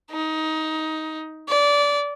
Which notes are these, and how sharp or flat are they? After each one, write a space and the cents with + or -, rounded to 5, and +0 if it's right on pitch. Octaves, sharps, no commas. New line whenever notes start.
D#4 +15
D5 -20